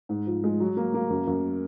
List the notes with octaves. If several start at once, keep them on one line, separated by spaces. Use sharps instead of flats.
G#2
F3
G#3
F#3
A#3
A#3
F#2
F#2